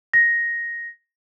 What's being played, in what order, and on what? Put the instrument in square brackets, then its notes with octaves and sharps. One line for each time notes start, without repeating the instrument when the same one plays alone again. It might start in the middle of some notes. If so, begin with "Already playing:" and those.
[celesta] A#6